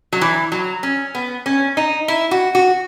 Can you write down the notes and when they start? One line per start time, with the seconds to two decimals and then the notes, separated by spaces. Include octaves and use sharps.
0.13 F#3
0.21 E3
0.52 F#3
0.83 C#4
1.15 B3
1.46 C#4
1.77 D#4
2.08 E4
2.31 F#4
2.55 F#4